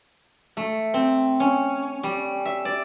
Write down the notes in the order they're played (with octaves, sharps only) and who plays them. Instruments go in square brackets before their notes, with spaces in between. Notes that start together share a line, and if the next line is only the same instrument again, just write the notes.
[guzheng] A3
C4
C#4
G3
E5
D5